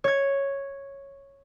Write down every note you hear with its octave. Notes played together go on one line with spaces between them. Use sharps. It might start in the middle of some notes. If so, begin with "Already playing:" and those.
C#5 G#6